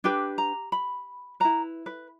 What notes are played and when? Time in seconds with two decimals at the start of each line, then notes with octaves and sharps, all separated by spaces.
0.04 D4 G4 B4 G5
0.38 A#5
0.72 B5
1.40 E4 B4 A#5
1.86 B4